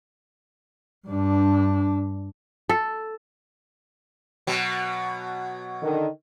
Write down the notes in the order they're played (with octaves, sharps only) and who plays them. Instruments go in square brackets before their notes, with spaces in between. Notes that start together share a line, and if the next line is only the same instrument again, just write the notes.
[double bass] G2 D4
[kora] A4
[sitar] B2 F#3
[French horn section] D3 D#3